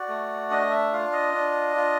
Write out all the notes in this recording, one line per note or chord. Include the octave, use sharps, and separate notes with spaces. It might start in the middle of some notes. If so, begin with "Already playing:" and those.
Already playing: F#4 D5
A3
D4 D#5
E5
F4 F5
D#5
D4
F4